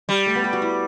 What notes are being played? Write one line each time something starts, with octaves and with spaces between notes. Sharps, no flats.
G3
A3
B3
G4
F#4
E4